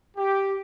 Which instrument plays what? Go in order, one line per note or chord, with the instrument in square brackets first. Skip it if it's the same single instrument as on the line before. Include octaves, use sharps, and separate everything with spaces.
[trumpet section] G4